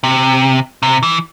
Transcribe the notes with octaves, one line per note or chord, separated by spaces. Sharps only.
C3
C3
E3